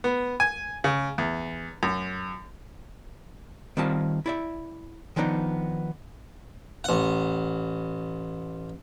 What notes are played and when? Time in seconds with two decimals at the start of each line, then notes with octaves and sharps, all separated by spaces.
0.04 B3
0.40 G#5
0.84 C#3
1.18 E2
1.83 F#2
3.77 D#3 G3 C4 F4 F5 A5
4.26 E4 D5 E5
5.16 D#3 F3 B3 D4 D#4
6.84 A1 F#5